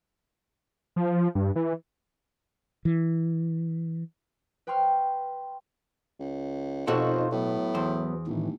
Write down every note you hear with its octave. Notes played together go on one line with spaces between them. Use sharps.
F3
G2
E3
E3
B4 G5 C6 C#6 F6
C#2
F1 B2 D#4 F4 F#4 A4 C5
A2 F#3 B3
E2 C5
G1 A2 D#3 E3